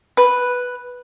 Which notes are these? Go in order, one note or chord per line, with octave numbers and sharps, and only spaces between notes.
B4